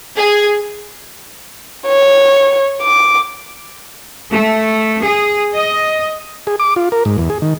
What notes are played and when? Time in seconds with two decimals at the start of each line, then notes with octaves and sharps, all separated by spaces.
0.17 G#4
1.87 C#5
2.82 D6
4.31 A3
5.02 G#4
5.55 D#5
6.47 G#4
6.60 D6
6.76 F4
6.92 A#4
7.05 G#2
7.18 E2
7.30 G#4
7.42 D#3